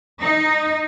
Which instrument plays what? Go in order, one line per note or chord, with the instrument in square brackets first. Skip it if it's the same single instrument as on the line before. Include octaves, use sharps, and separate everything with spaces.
[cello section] D#4